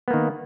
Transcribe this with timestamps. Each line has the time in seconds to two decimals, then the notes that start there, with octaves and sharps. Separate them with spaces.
0.08 B3
0.11 A#3
0.14 D#3